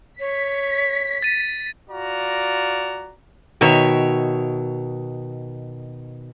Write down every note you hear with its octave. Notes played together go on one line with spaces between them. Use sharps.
C#5 B6
A6 D#7
F4 F#4 D5 A#5
B2 D#3 C#5 E5